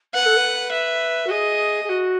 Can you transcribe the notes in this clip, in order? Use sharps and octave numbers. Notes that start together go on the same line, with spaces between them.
B4 F#5
A4
B4
E5
F#4
G#4 D#5
G#4
F#4